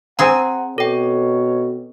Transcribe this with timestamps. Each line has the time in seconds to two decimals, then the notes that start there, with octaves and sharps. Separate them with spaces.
0.19 C4 G#4 F#5 G#5 A#5
0.78 B2 A4 C#5 G5